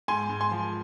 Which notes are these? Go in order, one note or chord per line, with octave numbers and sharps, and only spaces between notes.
G#2 G#5 C6
G#2
G#5 C6
F3